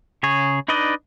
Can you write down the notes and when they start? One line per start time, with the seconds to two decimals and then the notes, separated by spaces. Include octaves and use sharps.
0.23 C#3 G#4 C#5
0.68 D4 D#4 B4 D5 D#5